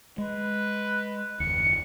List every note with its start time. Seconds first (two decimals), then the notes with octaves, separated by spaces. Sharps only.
0.18 G#3 B4
1.40 F#1 D#2 C#7